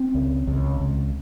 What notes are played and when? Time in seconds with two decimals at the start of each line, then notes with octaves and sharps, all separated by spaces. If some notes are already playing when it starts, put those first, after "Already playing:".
Already playing: C4
0.14 C#2
0.47 C#2
0.80 C#2